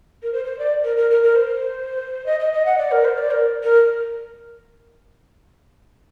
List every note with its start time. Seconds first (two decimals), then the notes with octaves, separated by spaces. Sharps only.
0.23 A#4
0.33 C5
0.45 C5
0.59 D5
0.84 A#4
0.96 A#4
1.10 A#4
1.23 A#4
1.36 C5
2.26 D#5
2.39 D#5
2.53 D#5
2.65 F#5
2.78 D5
2.91 A#4
3.04 C5
3.18 D5
3.30 A#4
3.63 A#4